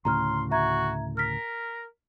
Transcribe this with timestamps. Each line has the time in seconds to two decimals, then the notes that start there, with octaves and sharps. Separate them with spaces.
0.05 D2 A2 C#3 A#5 C6 F6
0.51 F#4 E5 A#5 G#6
1.17 A#4 F6 B6